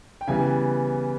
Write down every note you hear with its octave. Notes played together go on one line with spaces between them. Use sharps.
G5
C#3 E3 G3 B3 G#5